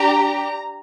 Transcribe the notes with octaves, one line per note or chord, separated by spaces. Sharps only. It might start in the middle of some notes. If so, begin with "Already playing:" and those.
Already playing: D4 G4 A#5